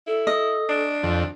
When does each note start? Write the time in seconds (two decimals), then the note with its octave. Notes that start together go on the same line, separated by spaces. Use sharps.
0.07 E4 A4
0.27 D#5
0.69 D4
1.03 F2